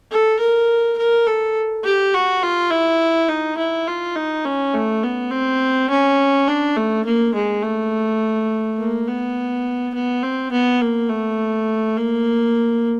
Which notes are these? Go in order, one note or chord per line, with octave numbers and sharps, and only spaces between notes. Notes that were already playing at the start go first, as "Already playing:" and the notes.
A4
A#4
A#4
A4
G4
F#4
F4
E4
D#4
E4
F4
D#4
C#4
A3
B3
C4
C#4
D4
A3
A#3
G#3
A3
A#3
B3
B3
C4
B3
A#3
A3
A#3